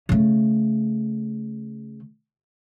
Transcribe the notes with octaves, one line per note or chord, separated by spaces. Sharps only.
C#3 A3